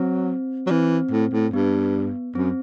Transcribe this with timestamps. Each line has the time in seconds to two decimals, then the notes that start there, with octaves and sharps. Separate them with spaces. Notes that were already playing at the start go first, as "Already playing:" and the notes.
Already playing: F#3 C4
0.67 F#3
0.70 E3 C4
1.11 A2
1.33 A2
1.53 G2 B3
2.35 F#2 C4